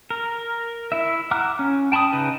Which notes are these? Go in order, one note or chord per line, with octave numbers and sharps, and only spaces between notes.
A#4
E4 E5
F#5 A#5 D6 F6 F#6
C#4
G5 A5 B5 C6 D#6
C#3 D#4 B4